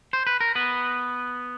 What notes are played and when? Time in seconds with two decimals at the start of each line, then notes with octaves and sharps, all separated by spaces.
0.13 C5
0.27 B4
0.40 A#4
0.55 B3 B4